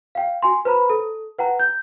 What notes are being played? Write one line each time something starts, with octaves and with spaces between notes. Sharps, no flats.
F5 G5
F#4 G#5 C6
B4 C5 A#5 B5
A4
B4 F#5 G5 A#5
G6